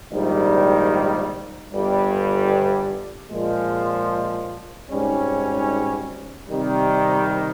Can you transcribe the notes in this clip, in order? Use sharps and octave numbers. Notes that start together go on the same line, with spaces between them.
A#1 G#2 D#3 G3
G1 G2 G3
A#2 F3 G#3
G#1 G#2 G3 C#4
C3 D#3 G3